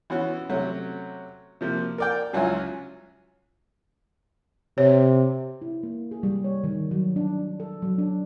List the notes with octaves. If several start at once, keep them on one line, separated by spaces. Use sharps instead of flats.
E3 B3 C#4 F#4
C3 F#3 A3 C#4
C3 F3 A#3
A#4 D5 G5
C#2 F#3 E4 F4 G#5
C3 C#5
E4
A#3
G#4
G3
C#5
D#3
F#3
D4
D4
A4
F#3
D4